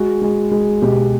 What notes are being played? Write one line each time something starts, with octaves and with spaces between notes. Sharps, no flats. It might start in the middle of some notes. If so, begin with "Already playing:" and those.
Already playing: G#3 F#4
G#3
G#3
B2 G4